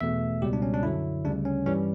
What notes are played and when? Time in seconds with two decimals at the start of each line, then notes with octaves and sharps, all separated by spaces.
0.01 E2 B2 A3 E5
0.42 C#2 B2 G3 G4
0.53 D4
0.62 C#4
0.74 D4
0.83 F#2 D3 F#3 E4
1.24 D2 C#3 G3 D4
1.45 C#4
1.66 G2 E3 G3 C#4